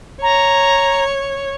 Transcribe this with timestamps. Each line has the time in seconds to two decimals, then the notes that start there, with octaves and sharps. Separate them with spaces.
0.22 C#5 A#5